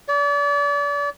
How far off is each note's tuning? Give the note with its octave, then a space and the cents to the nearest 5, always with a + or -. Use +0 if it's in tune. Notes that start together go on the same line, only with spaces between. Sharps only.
D5 -35